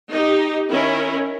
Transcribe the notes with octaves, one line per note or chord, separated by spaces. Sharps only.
D#4 G4
D#3 C#4 E4 A#4